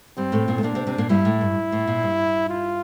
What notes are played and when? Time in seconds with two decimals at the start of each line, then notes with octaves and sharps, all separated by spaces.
0.17 G2 G3 C4
0.32 A2 A3
0.48 A#2 A#3
0.58 A3
0.63 A#2 A#3 D4
0.75 C3 C4
0.87 C3 C4
0.98 A#2 A#3
1.09 G2 G3 E4
1.25 A2
1.41 G2
1.72 A2
1.88 A#2
2.03 G2
2.49 F4